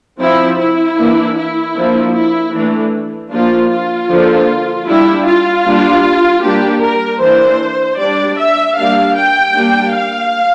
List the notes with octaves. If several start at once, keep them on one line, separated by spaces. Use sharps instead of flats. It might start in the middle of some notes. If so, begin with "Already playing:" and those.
F3 C4 E4
E4
E3 A#3 D4
E4
F3 A#3 D4
E4
E3 A3 D4
F3 A#3 D4 F4
F4
D3 F3 A#3 D4
G3 D4 E4
F4
G3 A#3 D4
G3 A#3 D4 G4
A#4
E3 A#3 D4 C5
G3 D4 D5
E5
G3 A#3 D4 F5
G5
G3 A#3 D4
F5